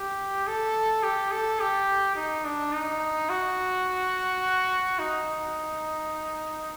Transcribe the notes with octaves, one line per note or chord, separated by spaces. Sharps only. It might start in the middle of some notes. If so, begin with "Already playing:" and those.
Already playing: G4
A4
G4
A4
G4
D#4
D4
D#4
F#4
D#4